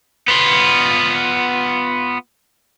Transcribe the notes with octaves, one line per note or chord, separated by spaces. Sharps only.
B3 F4